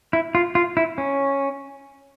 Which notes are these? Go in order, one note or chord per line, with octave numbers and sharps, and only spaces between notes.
E4
F4
F4
E4
C#4